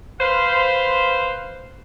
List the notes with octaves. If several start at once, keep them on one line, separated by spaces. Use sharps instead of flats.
B4 C5 F5